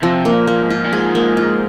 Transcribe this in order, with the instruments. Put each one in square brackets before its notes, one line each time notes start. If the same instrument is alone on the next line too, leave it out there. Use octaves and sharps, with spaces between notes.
[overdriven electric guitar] C3 [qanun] F3
[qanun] A#3
[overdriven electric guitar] A#2
[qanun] A#3
[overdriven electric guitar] G#2
[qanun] F4
[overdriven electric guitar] A#2
[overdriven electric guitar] G#2 [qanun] G#4
[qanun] A#3
F4